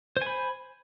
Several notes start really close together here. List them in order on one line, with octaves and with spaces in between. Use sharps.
C5 G#5 B5